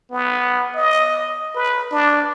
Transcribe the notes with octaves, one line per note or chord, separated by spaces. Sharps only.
B3
D#5
B4
D4